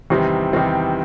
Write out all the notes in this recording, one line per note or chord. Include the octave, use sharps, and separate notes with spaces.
E2 C3 D#3 G3 C4
E2 C3 D#3 G3 C4